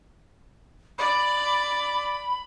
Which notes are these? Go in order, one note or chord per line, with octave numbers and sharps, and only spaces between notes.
D5 B5